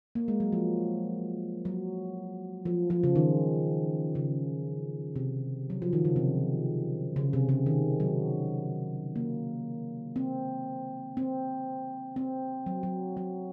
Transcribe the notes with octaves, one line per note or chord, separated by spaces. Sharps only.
A#3
G#3
F#3
F3
F#3
F3
F3
C#3
D#3
C#3
C3
F#3
F3
D#3
C#3
C3
C#3
C3
C#3
D#3
F#3
A#3
C4
C4
C4
F#3
F#3
F#3